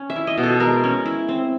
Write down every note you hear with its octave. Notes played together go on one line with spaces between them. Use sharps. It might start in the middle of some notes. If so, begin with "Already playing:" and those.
Already playing: C#4
E5
E4
D#5
B2
A4
G#3 A#4
C#4
E4
C4